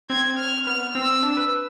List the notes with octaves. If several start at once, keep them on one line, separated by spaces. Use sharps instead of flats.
C4 G#6
F6
B3 F6
C4 E6
D4
B4